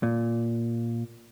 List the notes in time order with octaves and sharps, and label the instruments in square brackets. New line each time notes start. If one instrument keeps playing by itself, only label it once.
[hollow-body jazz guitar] A#2